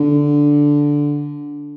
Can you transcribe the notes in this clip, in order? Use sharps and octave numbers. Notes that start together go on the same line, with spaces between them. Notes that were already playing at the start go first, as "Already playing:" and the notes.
Already playing: D3